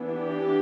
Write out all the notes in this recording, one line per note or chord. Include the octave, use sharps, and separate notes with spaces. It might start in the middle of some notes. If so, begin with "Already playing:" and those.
Already playing: E3 B3 D4
G4